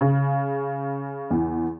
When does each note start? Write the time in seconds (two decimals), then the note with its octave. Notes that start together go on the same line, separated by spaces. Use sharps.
0.01 C#3
1.31 E2